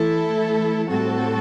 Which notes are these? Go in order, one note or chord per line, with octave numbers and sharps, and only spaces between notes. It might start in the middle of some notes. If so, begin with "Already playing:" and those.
Already playing: E3 A3 E4 A4
A2 G3 C4 F#4 A4